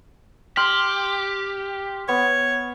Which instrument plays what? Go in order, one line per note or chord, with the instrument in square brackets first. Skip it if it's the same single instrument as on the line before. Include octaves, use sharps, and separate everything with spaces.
[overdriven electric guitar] G4 [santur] C6 [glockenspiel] F6 F#7
[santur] B3 [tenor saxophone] C#5